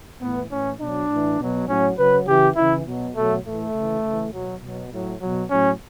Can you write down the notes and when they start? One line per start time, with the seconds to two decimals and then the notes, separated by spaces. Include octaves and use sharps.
0.22 A2 E3 B3
0.51 A2 E3 C#4
0.81 B2 F#3 D4
1.10 A2 E3
1.40 B2 F#3
1.69 A2 F#3 C#4
1.98 C#3 F#3 B4
2.27 C#3 E3 G4
2.56 C#3 E3 E4
2.86 B2 F#3
3.16 B2 F#3 A3
3.45 A2 E3 A3
3.75 C#3 E3
4.04 C#3 E3
4.33 B2 F#3
4.62 B2 F#3
4.92 A2 F#3
5.21 B2 F#3
5.50 A2 F#3 C#4